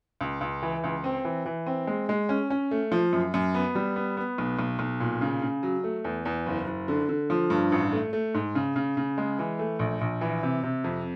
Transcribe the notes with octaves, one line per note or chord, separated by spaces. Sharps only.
C#2
C#2
E3
C#2
C4
E3
E3
C4
G#3
G#3
C#4
C#4
A3
F3
F#2
F#2
B3
G3
B3
B3
B1
B1
B1
A#2
C#3
C#3
F#3
A3
E2
E2
F#1
F#1
D3
D3
F3
G2
A1
A3
A3
G#2
C#3
C#3
C#3
G#3
E3
A3
A#1
A#1
E3
C3
C3
F2